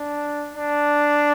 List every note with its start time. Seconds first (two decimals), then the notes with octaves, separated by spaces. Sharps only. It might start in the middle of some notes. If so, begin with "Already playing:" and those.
Already playing: D4
0.54 D4